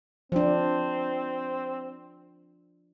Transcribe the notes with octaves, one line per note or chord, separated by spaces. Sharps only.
F3 C4 D4